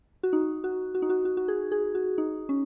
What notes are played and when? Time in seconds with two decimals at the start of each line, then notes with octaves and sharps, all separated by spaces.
0.23 F#4
0.33 D#4
0.64 F#4
0.95 F#4
1.02 D#4
1.10 F#4
1.25 F#4
1.37 F#4
1.48 G#4
1.72 G#4
1.95 F#4
2.18 D#4
2.49 C#4